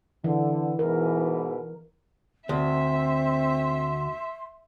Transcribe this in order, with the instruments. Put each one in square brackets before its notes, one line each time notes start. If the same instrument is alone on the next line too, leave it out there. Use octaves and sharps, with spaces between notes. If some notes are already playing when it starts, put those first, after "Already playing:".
[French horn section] D3 [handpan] E3
[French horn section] G#2 B2 E3 [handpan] A#4
[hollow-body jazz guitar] D2 [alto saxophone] C4 [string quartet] E5 [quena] C6